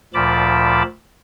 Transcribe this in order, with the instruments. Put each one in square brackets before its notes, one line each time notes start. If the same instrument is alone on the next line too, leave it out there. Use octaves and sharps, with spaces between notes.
[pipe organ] D2 A#2 F3 A5 B5 D6